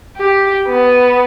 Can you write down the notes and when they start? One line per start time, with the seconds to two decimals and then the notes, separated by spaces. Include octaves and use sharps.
0.17 G4
0.68 B3